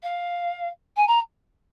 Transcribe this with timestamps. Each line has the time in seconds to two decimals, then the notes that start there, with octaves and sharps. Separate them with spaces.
0.03 F5
0.96 G#5
1.07 A#5